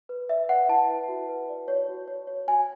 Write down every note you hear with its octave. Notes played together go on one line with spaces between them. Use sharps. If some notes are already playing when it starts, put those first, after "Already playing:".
B4
D5 E5
B4 F#5
E4 A5
B4
F#4
B4
D5
C#5
F#4
C#5
C#5
F#4 G#5